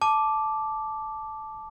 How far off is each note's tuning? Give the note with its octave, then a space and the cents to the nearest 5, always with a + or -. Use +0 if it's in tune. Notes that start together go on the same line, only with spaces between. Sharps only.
A5 -10 D6 +0